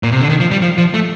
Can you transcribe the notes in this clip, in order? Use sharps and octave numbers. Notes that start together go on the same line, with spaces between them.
A#2
C3
D3
D#3
F3
G3
F3
F3
A3